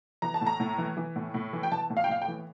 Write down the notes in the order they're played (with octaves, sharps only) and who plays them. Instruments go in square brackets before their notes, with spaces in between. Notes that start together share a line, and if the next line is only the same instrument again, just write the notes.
[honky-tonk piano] E3 A#5
A5
A2
A#5
A2
E3
E3
A2
A2
E3
G5
E3 A5
A2
F5
G5
A2 F5
G5
E3